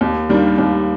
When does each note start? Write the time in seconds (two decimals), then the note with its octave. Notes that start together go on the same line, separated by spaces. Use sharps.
0.01 D#2
0.29 D#3 G3 A#3 D4
0.58 D#2